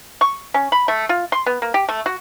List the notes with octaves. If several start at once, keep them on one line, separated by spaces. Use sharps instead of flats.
C#6
C#4
B5
A3
F4
C6
B3
A#3
G4
A3
F#4